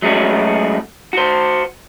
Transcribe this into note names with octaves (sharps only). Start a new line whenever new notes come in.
F#3 G#3 A3 C#4 F#4
F#4 C5